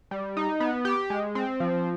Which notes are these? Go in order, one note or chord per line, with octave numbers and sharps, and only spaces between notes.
G3
D#4
B3
G4
G#3
C4
F3